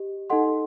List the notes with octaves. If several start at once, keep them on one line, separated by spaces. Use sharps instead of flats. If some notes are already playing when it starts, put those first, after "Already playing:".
Already playing: G4 D#5
D#4 A4 D#5 F#5 C6